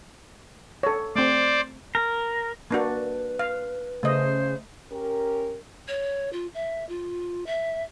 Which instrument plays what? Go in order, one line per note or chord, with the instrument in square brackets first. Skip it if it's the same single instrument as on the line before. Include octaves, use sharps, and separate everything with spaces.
[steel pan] A4 C#5
[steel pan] A3 C4 [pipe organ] C5 D5
[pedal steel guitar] A#4
[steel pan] A#3 D4 F#4 [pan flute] B4
[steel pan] F5
[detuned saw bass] C#3 [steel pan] A3 D#5 [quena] C5
[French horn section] C#4 G4 A#4
[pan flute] C#5
F4
E5
F4
E5